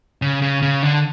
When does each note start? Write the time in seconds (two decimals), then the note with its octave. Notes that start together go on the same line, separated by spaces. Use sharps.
0.22 C#3
0.42 C#3
0.62 C#3
0.82 D3